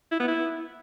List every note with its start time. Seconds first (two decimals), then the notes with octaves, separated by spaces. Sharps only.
0.12 E4
0.20 B3
0.28 E4